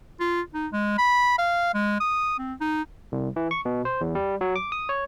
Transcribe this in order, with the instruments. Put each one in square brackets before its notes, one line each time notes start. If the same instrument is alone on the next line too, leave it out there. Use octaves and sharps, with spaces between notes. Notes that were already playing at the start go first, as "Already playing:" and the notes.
[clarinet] F4
D#4
G#3
B5
F5
G#3
D#6
C4
D#4
[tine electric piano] C2
E3
C#6
B2
C5
E2
G3
F#3
D6
D#6
C#5